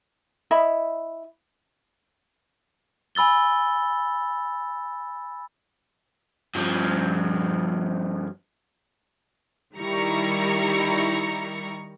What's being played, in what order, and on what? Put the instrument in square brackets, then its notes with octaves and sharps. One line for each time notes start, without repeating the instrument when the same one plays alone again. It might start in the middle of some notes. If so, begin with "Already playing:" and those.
[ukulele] E4 D#5 E5 B5
[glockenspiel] G#5 B5 E6 A6 G7
[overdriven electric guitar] G2 F3
[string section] D#3 G3 E4 A#5 C#6